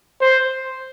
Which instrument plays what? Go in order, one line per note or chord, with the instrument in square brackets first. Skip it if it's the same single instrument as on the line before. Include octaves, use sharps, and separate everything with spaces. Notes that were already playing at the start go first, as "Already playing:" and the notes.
[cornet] C5